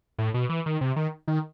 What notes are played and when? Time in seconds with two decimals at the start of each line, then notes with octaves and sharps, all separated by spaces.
0.18 A2
0.34 B2
0.49 E3
0.66 D#3
0.81 C3
0.96 D#3
1.28 D#3